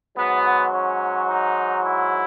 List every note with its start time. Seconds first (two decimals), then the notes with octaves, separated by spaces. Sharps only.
0.16 G#2 F#3 B3
0.72 C#4
1.27 D#4
1.83 E4